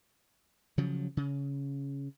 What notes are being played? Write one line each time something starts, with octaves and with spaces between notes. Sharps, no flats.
C#3 F3 F#3
C#3